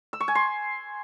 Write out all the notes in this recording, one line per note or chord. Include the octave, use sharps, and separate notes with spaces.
E6
C#6
G#5
C6